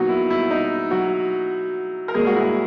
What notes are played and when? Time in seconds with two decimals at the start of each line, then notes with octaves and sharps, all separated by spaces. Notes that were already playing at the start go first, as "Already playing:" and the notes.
Already playing: B2 F#3 A#3 D#4 F#4 D#5
0.09 E4
0.30 E4
0.50 D#4
0.91 F#3 F#4
2.08 A#4
2.14 A#2 G#3 A#3 G#4
2.27 F#4
2.35 E4